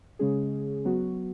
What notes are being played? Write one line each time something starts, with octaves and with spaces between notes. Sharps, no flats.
C#3 G#3 C#4 G#4
F#3 B3 F#4